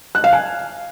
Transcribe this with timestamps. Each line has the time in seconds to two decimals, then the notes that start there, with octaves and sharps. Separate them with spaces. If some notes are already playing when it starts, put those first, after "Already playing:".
0.15 F#6
0.24 F5
0.33 G#5